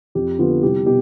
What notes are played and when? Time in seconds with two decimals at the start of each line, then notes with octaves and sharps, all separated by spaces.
0.15 F2 G4
0.38 D3 F3 B3 F4
0.62 C2 G4
0.86 B2 G4